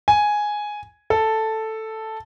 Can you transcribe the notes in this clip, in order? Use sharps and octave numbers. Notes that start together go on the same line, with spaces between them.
G#5
A4